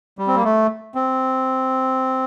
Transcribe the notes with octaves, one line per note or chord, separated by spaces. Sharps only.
G3
C4
A#3
A3
C4